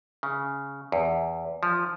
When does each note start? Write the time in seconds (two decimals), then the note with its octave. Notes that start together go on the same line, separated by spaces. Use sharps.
0.23 C#3
0.92 E2
1.63 F3